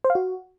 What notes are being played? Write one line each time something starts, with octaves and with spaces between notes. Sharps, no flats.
C5
F5
F#4